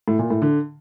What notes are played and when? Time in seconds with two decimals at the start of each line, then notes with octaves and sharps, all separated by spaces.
0.08 A2
0.19 A#2
0.30 A2
0.42 D3